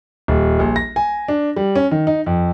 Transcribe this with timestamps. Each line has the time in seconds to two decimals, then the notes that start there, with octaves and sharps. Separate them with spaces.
0.28 D#1
0.59 A#1
0.76 A#6
0.96 G#5
1.28 D4
1.56 G3
1.76 C#4
1.91 D#3
2.07 D#4
2.26 F2